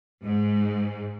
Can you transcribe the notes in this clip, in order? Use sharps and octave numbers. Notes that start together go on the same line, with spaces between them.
G#2